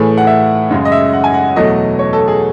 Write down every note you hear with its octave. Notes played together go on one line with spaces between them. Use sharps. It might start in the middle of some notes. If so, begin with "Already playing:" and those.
Already playing: A2 E3 A3 G#4
F#5
E5
F#2 C#3 G#3
D#5
E5
F#5
G#5
F#5
E2 B2 F#3 A3 D#5
C#5
A4
G#4